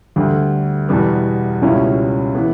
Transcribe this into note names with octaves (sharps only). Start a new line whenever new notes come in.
D2 D3 G3
E2 B2 G3 B3
C#2 B2 G3 C#4 E4
E3 B3